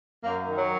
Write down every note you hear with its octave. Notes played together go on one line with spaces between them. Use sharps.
F#2 A#3
D#3
F#3